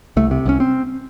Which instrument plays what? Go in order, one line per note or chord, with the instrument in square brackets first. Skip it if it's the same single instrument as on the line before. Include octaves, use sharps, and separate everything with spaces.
[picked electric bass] C2 A3
C3
C2 C#4
C4